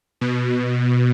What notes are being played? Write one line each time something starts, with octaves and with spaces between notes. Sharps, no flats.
B2